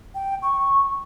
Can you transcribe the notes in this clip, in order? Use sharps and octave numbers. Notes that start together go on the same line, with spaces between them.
G5
C#6